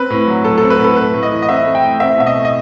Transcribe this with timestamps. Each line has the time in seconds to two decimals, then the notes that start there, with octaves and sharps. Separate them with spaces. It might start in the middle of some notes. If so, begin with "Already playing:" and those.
Already playing: C4 B4
0.10 A2
0.27 F#3
0.45 A2 A4
0.58 C4 A4
0.70 B4
0.79 A2
0.84 A4
0.96 A3 B4
1.14 A2
1.23 D#5
1.32 E3
1.42 D#5
1.49 C4 E5
1.66 A3
1.75 G5
1.84 A2
2.00 C4 E5
2.18 B2 E5
2.26 D#5
2.35 A3
2.45 D#5